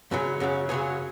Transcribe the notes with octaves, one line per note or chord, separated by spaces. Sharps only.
F#2 C#3 F#3 C#4
F#2 C#3 F#3
F#2 C#3 F#3 G#4 C#5